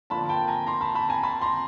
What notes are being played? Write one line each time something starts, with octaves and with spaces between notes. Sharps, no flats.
D3 F3 A#3 D4 F4 A5 B5
G5 A5
G#5 A#5
A#5 C6
A5 B5
A5 B5
G#5 A#5
A5 B5
A#5 C6